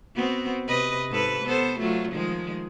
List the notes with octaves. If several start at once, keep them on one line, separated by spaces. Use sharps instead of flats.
B3 C4 F#4
C3 B4 D#5
G#2 A4 B4
B3 A4 C5
F#3 A3 F4
D#3 F3 G#3